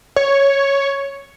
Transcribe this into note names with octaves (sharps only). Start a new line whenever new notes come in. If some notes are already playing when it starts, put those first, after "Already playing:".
C#5